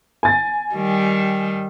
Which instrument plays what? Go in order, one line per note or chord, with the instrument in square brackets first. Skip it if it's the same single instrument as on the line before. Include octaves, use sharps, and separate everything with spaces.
[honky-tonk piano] G#5 A6
[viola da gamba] D#3 G3